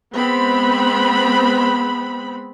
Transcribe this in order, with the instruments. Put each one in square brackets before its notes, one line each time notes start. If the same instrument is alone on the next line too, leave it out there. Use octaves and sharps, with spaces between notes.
[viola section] G#3 B3 C4 B5